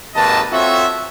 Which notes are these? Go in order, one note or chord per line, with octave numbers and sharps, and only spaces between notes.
G#1 D#2 B4 D#5 A5
C4 F4 F#4 A4 C#5 E5